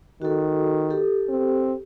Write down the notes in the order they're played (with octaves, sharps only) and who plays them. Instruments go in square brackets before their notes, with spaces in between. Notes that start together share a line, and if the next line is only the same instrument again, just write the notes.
[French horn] D#3 [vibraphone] F#4 A4
[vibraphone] G4 A4
[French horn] C4